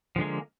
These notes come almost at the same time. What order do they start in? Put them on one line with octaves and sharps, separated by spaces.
F3 D3 G#3 A#3